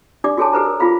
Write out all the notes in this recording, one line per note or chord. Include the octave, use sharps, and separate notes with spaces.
D4 G4 D5 D6
F#4 G#4 A4 C#5 G#5 A5
G4 A4 B4 C5 A#5
A#4
F4 G#4 F5 B5